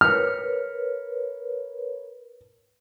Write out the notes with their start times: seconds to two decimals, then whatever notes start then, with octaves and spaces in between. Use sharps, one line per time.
0.01 A#4 B4 C#5 F6